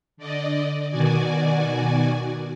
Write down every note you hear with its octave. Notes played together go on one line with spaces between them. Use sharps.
D3 D5 D#5
B2 D#3 F#4 D5 G#5